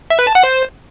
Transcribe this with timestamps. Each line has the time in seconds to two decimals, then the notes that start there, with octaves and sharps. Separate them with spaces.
0.10 E5
0.19 B4
0.27 A5
0.35 F#5
0.43 C5